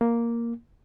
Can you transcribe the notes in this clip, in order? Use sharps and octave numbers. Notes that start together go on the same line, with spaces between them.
A#3